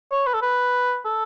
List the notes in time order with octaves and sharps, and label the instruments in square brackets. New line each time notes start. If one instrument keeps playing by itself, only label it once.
[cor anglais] C#5
B4
A4
B4
A4